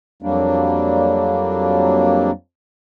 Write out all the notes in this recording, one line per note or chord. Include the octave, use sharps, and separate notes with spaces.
F2 F#3 G3 A#3 D4